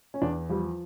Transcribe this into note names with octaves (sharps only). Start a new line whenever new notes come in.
C#4
E2 D4
F3 G3